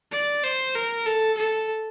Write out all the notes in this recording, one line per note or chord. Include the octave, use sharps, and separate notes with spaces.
D5
C5
A#4
A4
A4